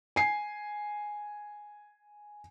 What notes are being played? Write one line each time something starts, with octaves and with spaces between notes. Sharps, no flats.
G#5 C7